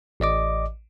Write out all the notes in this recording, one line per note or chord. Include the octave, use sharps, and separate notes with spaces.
A1 D5 D#5 D6